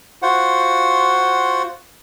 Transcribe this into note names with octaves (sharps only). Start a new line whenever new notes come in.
F4 F#4 C5 F#5